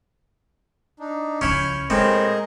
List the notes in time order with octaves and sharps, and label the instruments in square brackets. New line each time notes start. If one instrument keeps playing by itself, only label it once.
[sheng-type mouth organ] D4 D#4
[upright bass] C#2 F3 [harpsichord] C#4 E4 [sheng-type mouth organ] F6 G6
[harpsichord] A2 C4 [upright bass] G#3 A#3 [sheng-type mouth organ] G#4 A#4 D#5